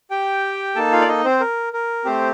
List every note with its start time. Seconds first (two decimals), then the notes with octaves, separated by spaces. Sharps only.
0.11 G4 G5
0.75 A#3 D#4 A4 A5
0.92 F4 F5
1.01 D5
1.08 D#4 D#5
1.24 C4 C5
1.40 A#4
1.73 A#4
2.05 A3 C4 G4 C5